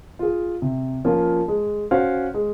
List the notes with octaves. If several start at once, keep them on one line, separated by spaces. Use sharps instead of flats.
F4 G#4
C3
F3 A#3 C#4 F4
G#3
C#4 F#4 C5 F5
G#3